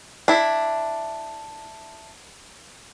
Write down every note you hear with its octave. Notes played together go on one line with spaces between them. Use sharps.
D4 E4